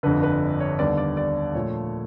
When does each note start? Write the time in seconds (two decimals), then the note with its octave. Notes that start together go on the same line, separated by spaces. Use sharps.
0.03 G1 F2 D3 B4
0.23 B4
0.60 C#5
0.79 D#2 D3 G3 B3 D5
0.98 D5
1.17 D5
1.55 A#2 F3 A3 C#5